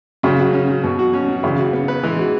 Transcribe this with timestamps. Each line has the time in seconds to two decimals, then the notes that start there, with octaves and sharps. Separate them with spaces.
0.23 C#3 F#3
0.39 F#4
0.53 C#4
0.69 F#3
0.84 B2 F#3
0.99 F#4
1.13 C#4
1.28 F#3
1.43 C#3 E3
1.58 F#4
1.73 B3
1.88 B4
2.03 E3 G#3
2.19 F#4